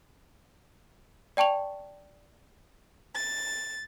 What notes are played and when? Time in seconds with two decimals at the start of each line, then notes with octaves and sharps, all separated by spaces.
1.37 D5 G5 A5 C#6 F7
3.14 A6